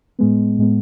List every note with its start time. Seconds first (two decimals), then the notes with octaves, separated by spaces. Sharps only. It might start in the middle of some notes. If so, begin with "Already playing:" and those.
0.19 A2 G#3 B3
0.58 A2 G#3 B3